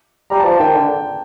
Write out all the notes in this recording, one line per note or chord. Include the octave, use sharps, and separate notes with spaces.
G3 A#5
A5
F3
A5
D#3 G5
D3